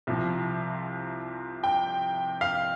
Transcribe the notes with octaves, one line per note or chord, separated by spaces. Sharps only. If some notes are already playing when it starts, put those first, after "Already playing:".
C2 C3 F3
G5
F5